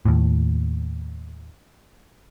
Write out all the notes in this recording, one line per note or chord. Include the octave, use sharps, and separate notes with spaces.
D#2 A2